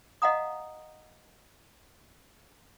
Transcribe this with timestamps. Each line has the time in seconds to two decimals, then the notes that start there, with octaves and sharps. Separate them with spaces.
0.22 D#5 F5 F#5 A#5 D#6